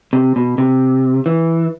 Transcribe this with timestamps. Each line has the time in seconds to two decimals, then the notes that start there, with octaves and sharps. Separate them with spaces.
0.13 C3
0.36 B2
0.58 C3
1.26 E3